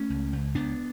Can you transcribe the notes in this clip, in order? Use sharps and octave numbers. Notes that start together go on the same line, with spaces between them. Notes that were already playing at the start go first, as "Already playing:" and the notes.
Already playing: A3 C#4
C#2
C#2
C#2 B3 D4